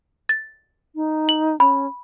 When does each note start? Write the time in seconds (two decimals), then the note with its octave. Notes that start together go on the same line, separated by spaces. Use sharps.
0.29 A6
0.95 D#4
1.29 F#7
1.60 C#4 B5